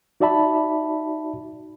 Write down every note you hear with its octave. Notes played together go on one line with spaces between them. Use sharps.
D#4 F#4 D5 E5 A5 B5